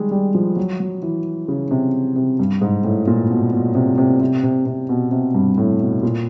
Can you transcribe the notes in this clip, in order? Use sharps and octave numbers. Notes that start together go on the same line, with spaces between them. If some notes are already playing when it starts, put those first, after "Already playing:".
Already playing: D#3 G3 G#3
G3
F3
F#3
F#3
E3
C#3
C3
C3
G2
G#2
A2
A#2
B2
B2
C3
C3
C3
C3
C3
B2
C3
G2
A2
B2
A#2